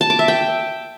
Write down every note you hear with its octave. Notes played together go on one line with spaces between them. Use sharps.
A5
D6
E5
G5